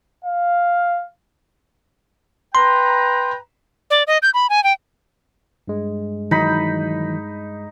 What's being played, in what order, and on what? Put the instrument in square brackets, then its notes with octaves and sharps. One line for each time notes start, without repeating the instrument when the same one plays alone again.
[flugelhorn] F5
[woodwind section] B4 G5 A#5 [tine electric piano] C6
[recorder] D5
D#5
G6
B5
G#5
G5
[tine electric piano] G2 G#3
[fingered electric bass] D#3 E3 F#3 [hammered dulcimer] D#4 B5